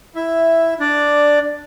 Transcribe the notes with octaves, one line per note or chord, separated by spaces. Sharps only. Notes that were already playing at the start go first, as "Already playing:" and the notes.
E4 E5
D4 D5